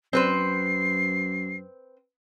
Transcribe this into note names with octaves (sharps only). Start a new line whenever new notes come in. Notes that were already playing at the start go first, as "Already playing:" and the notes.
F#2 C4 B4 C5 C7